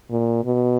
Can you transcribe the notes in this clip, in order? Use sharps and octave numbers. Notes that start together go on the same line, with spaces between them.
A#2
B2